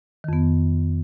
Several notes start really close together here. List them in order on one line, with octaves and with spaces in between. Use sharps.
D#3 F2 B3